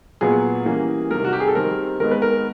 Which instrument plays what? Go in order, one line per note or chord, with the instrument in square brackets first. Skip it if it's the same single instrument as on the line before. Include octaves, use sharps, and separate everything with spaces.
[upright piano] A#2 F#3 B3 G#4
E3 G3 A#3 C#4
C3 D#3 G3 A#4
F#4
G4
G#4
A4
D#3 G3 C4 A#4
D#3 G#3 B3 A#4
B4
A#4